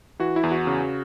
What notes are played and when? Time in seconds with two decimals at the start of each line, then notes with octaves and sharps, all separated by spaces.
0.20 E3 F#4
0.36 E4
0.43 E2
0.51 F#4
0.67 C#3